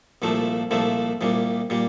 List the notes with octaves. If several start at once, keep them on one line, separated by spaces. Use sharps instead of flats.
C2 A#2 F3 A3
C2 A#2 F3 A3
C2 A#2 G3
A#2 G3